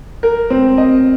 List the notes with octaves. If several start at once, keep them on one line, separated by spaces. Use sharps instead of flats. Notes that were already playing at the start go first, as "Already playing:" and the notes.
A#4
C4
D#5